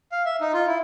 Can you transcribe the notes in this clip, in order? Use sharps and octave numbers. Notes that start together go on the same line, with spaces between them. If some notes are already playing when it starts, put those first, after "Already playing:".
F5
E5
D#4
F4
E4